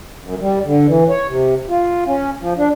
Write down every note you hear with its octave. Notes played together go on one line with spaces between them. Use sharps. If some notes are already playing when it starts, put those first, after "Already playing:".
F#2
G3
D3
E3
C#5
C3
F4
C#4
F3
D4